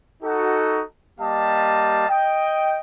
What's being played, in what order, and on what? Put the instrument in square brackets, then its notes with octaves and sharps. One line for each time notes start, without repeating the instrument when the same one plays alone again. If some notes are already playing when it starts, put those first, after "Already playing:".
[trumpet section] D#4 F#4 A4
G3 A#3 G4 D#5 F5 A5
D#5 G5